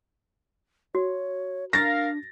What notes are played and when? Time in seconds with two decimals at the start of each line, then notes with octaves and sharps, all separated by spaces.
0.95 F#4 C#5
1.73 D4 A#4 F5 A6 A#6